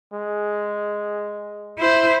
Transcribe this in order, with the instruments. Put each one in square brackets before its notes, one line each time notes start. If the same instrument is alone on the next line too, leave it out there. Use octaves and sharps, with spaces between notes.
[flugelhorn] G#3
[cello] E4 C5